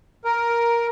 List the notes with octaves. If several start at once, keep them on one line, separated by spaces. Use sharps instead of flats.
A#4